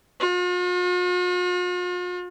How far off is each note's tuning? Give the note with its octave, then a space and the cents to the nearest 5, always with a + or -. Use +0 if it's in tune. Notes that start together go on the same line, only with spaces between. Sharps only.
F4 +45